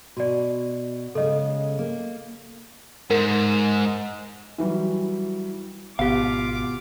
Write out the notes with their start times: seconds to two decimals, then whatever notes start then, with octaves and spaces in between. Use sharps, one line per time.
0.17 B2 F#4 D5
1.15 C#3 G#3 A4 D#5
1.79 A#3
3.11 G#2 A#4
4.58 E3 F#3 G3
5.99 G#1 B2 F4 G4 F5 D6